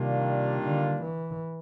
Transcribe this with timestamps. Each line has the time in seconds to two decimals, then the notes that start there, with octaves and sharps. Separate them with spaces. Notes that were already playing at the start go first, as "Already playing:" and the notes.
Already playing: C3 D#3 G3 A#3 D4 F4
0.63 D3
1.02 E3